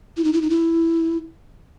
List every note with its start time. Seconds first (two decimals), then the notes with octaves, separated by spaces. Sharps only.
0.17 E4
0.24 D#4
0.33 E4
0.42 D#4
0.50 E4